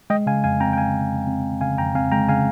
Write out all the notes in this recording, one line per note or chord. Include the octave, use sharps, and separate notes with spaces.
G#3 D#5 G5
C#3 F5 G#5
F2 F5 G#5
C4 G5 A#5
G5
G#3 F5 G#5
C#3
F2
C4
G#3
C#3 F5 G#5
F2 G5 A#5
C4 F5 G#5
G#3 G5 A#5
C#3 F5 G#5